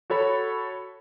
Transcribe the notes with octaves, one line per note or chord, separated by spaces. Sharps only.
F#4 A4 C#5 B5